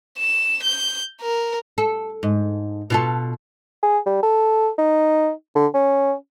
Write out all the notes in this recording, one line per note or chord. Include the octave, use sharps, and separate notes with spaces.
E7
G6
A#4
A4
G#2
B2 F4 A4
G#4
G3
A4
D#4
D3
C#4